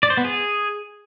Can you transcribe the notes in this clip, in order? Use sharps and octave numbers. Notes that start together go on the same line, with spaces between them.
D5
C5
B3
G#4